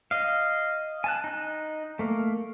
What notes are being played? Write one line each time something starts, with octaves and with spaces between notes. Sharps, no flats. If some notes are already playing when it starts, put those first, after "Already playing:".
D#5 F5
G#5 A5 F#6
D#4 F#6
A3 A#3